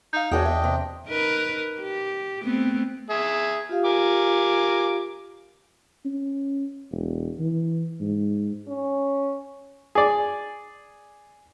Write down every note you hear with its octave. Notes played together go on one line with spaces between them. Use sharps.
D#4 F5 G6
E2 D4 F#4 G#4 C#5 D#5 G5
E5
C3
D#4 A#4 B4
G4
A3 B3 C4
G#4 E5
F4 G4 F5
A#4 G#5 D6
C#4
E1
E3
G#2
C#4
G#4 D5